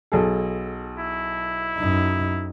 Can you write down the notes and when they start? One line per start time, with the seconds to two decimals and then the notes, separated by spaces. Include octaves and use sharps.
0.12 B1 G#4 A4
0.99 E4
1.77 F#2 D#4